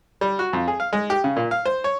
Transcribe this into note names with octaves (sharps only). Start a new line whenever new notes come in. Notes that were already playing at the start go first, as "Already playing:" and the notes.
G3
F#4
F2
G#4
F5
G#3
G4
C#3
A#2
F5
C5
C#5